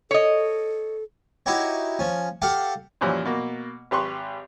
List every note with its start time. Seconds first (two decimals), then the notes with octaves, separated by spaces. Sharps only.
0.11 A4 C#5 D#5
1.46 D#4 E4 F#4 G4 C#5
1.99 F3 C#4
2.42 G4 A4 F5 F#5
3.01 F#2 A#2 E3 F3 G3 C#4
3.25 B2 A#3
3.91 G#1 G4 B4 C6 C#6